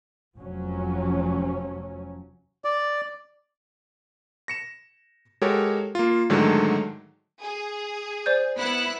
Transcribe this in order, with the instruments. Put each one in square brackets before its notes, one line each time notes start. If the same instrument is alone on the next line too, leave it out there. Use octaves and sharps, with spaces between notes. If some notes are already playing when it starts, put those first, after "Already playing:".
[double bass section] F1 F3 F#3 C#4
[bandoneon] D5
[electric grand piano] A#6 C#7 E7
G#3 F#4 G4 A4 A#4 C#5
A#3 F4
G#2 D3 D#3 F#3 G#3 A3
[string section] G#4
[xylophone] C5 D5 G6
[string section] B3 E4 F#6